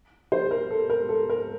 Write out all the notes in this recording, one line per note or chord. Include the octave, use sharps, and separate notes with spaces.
C5
A#4
A4
A#4
A4
A#4